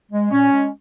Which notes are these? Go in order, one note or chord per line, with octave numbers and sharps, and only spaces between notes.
G#3
A#2 C#4
G#3